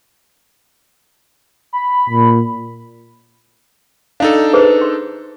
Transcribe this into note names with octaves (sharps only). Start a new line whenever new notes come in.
B5
A#2
D4 D#4 A4 F5
G#4 B4 C5
C6